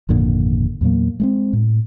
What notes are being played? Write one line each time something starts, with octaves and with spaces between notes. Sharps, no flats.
G#1 F2 A#2 D3
E2 A#2 F#3 A#3
G#3 A3 C4
A2